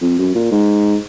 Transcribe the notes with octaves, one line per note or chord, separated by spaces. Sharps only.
F2
F#2
A#2
G#2